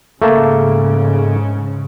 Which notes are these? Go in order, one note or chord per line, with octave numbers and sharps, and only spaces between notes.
G#2 C#3 A3 A#3 A5